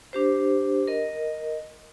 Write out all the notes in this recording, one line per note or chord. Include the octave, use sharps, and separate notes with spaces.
D4 G4 C5
A#4 D#5